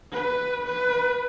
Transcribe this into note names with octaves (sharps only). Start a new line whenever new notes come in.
B4
B4